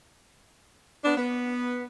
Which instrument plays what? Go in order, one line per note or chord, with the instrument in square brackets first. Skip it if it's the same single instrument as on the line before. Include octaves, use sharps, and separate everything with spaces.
[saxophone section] B3 D4
B3